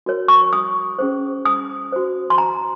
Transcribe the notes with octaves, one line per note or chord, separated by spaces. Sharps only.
F#4 A#4 C#5
C#6
D#6
C#4 G#4 C5
D#6
F#4 C5
C6
A#5